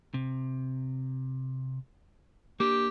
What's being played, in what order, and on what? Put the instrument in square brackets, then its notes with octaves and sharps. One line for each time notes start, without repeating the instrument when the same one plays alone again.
[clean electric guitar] C3
[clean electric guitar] A#3 D4 [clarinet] G4